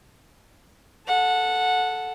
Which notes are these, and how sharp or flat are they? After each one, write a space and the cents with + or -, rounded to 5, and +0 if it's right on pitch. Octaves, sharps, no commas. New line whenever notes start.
A4 -5 F#5 -15